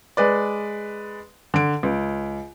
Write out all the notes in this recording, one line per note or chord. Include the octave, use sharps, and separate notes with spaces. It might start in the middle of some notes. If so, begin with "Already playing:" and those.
G#3 B4 D5
D3 D7
C#2